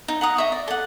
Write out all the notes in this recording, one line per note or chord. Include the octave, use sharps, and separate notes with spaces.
D#4
F#5 A#5 D#6
D#5 E5 C#6
D5
A4 F#5